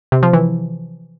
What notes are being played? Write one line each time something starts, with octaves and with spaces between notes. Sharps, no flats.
C3
F3
E3